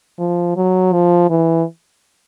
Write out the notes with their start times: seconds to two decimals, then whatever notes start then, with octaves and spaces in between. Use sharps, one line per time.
0.19 F3
0.56 F#3
0.93 F3
1.30 E3